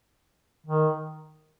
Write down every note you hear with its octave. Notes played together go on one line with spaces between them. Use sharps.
D#3